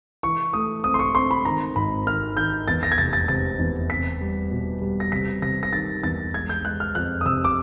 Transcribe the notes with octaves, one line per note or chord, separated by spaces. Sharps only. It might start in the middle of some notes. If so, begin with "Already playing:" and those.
E3 C#6
A3 D#6
C4 D#6
C6
C#6
C4 C6
B5
D#3 A#5
G#1 B5
D#3 F6
D#3 G6
E2 A6
A#6
G#6
F1 A6
A6
C3 A6
E2
C4 B6
G3
B2
G3
A#6
C3 B6
C3 A#6
A#6
D#3 A6
E2 A6
G#3 G#6
G6
G#3 F#6
F6
F2 F#6
D#6
C3 E6
D6